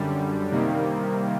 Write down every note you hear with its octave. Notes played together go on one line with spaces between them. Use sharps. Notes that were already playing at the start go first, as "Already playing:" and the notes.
Already playing: F#2 D3 G3
C3 D#3 G3 A#3